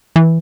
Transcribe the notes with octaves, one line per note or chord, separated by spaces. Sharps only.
E3